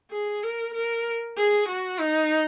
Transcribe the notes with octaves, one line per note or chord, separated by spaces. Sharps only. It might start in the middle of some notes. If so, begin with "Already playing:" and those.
G#4
A#4
A#4
G#4
F#4
D#4